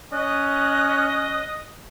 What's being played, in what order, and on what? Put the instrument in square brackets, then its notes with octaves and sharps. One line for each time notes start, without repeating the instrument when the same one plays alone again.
[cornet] C#4 [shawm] D#5 [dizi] F#6